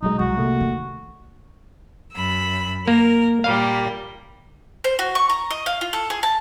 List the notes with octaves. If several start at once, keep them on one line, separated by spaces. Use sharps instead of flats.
C2 B2 F#3 G#3 D#4
C2 F#4
C3 A3 A#3
D#3
F#2 B5 E6
A#3 A#4
A#2 G3 A#3 F5
C5
F#4
C#6
A#5
D#5
F5
F4
A4
G#4
A5